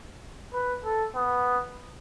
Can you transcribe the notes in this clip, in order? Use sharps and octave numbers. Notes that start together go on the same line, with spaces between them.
B4
A4
B3